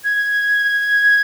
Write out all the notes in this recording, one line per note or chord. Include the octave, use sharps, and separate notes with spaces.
G#6